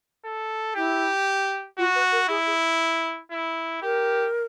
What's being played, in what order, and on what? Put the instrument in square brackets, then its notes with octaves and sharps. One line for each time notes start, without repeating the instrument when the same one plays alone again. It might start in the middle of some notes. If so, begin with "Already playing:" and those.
[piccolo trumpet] A4
[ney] E4 [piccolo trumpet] G4
[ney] F4 [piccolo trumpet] F#4
[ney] B4
A#4
[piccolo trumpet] E4 [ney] G#4
[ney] G#4
[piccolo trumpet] E4
[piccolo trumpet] G4 [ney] A#4